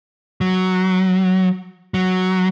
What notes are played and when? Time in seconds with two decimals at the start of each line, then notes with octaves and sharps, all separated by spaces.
0.41 F#3
1.94 F#3